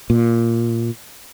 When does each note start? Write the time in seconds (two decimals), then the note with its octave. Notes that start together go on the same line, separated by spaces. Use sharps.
0.10 A#2